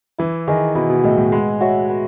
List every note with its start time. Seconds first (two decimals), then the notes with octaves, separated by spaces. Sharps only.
0.19 E3 E4
0.47 D#3 G#4 D#5
0.75 B2 E4
0.90 B2
1.03 A2 G#4 D#5
1.18 A2
1.32 G#3 B3
1.60 F#4 C#5 E5
1.89 B3